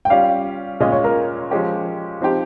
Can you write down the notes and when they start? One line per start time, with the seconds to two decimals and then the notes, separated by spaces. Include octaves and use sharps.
0.05 G5
0.10 G3 C#4 F4 F5
0.80 A#2 G#3 C#4 F4 D#5
0.92 C#5
1.04 A#4
1.51 F3 G#3 C#4 G4
2.21 F3 C4 D#4 G4